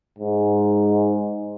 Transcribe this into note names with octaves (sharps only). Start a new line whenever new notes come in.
G#2